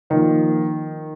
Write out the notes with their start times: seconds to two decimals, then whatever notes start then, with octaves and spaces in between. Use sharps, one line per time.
0.10 D#3 F3 A#3 F4 A#4 D#5